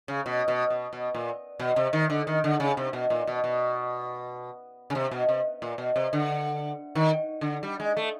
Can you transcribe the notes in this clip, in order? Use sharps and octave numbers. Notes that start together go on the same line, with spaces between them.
C#3
B2
B2
B2
B2
A#2
B2
C3
D#3
D3
D#3
D3
C#3
C3
B2
A#2
B2
B2
C#3
C3
B2
C3
A#2
B2
C3
D3
D#3
D3
G3
G#3
A3